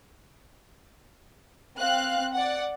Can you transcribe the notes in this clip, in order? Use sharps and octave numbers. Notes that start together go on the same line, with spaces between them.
C4 F5 F#6
D5 F#5